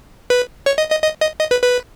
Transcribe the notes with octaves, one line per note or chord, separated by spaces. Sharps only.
B4
C#5
D#5
D#5
D#5
D#5
D#5
B4
B4